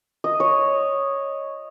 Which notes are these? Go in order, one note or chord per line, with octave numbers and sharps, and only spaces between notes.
D#5
C#5